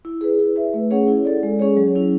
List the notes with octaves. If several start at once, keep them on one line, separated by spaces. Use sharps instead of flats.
E4
G#4 B4
E4
B4 E5
A3
C#4 G#4 C#5 F#5
E4
A4 D5
G#3
C#4 G#4 C#5
F#3
C#4 E4